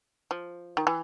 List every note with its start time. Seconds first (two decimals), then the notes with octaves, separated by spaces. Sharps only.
0.31 F3
0.77 D#3
0.87 E3